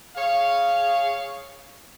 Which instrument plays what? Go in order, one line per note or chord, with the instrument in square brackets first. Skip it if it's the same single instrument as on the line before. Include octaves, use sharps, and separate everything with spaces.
[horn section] G#4 C#5 F5